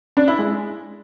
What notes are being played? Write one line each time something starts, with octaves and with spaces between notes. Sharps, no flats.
D4
E4
G#3